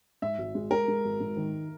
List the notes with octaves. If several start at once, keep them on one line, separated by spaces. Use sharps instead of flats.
G#2 E5
G#1
G#3
G#3 A#4
G#3
G#1
G#2
D#3